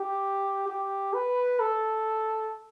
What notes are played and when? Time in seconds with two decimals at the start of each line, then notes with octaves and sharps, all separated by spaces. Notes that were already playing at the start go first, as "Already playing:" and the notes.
Already playing: G4
0.68 G4
1.14 B4
1.60 A4